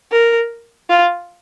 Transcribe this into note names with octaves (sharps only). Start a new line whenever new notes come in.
A#4
F4